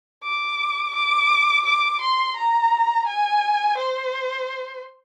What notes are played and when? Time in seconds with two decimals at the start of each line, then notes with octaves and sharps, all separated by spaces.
0.24 D6
0.95 D6
1.65 D6
2.01 C6
2.36 A#5
3.07 G#5
3.77 C5